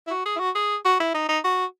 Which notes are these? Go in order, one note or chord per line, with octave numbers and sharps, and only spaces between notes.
E4
F#4
G#4
E4
F#4
G#4
F#4
E4
D#4
D#4
F#4